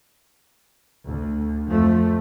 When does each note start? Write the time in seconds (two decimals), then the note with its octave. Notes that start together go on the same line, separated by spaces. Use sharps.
1.06 D2
1.70 F2 F3 A3